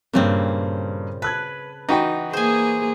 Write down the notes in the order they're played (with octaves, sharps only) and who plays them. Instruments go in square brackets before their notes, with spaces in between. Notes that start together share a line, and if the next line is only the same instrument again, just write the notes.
[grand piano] G2 A#3 [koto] A#2 C#3 C4
[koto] B4 [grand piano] A5 F#6 G#6
[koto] E3 [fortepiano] D#4 F#4 G5
[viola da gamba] A#3 G#4 [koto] C5 G#5